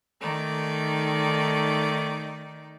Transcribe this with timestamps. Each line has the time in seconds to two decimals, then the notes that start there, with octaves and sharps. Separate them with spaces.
0.21 D#3 A3 D#4 D5